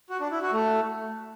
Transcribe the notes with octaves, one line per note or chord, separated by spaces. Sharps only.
F#4
D4
E4
F#4
A3